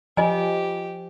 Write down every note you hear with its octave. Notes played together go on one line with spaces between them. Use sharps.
F3 F4 G4 D#5 G#5